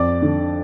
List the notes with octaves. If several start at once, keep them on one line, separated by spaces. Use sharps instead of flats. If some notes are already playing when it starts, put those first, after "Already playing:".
Already playing: F2 D5 D6
D3